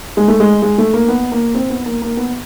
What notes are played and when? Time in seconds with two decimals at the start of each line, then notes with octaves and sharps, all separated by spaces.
0.17 G#3
0.28 A3
0.40 G#3
0.62 G#3
0.78 A3
0.94 A#3
1.08 B3
1.32 A#3
1.55 C4
1.70 B3
1.86 A#3
2.02 A#3
2.17 B3